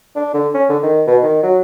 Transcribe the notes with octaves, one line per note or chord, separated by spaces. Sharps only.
D4
D3
C#4
D3
D#3
B2
D#3
F#3